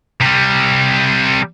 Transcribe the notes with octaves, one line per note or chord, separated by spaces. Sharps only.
C3 G3